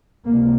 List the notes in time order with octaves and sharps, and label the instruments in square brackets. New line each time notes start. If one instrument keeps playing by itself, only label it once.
[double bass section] C#2 C3 A#3